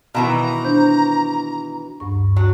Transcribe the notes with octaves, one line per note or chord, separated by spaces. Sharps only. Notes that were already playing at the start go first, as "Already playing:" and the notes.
B2 D#3 E3 F5 A#5
D4 C5 G6
D2 G2 C#6
F#3